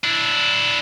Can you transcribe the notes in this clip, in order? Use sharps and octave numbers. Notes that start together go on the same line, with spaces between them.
D4 E4